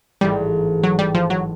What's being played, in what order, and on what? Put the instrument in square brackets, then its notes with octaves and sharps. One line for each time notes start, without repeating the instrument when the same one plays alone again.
[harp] A1 G#2 E3 [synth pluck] G3
[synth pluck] F#3
G3
F3
F#3